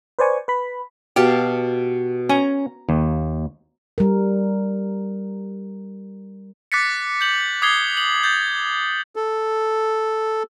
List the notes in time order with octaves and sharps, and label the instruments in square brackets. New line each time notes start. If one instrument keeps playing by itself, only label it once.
[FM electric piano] B4 C5 D5 G#5 C#6
B4 B5
[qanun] B2 F5 A5 [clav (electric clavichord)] G4
[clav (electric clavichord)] C#4 G#5 [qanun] A#5
[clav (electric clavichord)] D#2
[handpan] G3 A#4
[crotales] D6 F#6 A6 B6 C#7
G6 F#7
D6 D#6 G#6 C7 G7
F#7
G6 A6
[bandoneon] A4